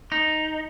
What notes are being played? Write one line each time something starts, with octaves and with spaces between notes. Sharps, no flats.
D#4